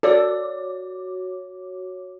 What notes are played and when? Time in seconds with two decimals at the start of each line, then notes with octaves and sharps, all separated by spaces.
0.03 F#4 A4 C#5 D5 D6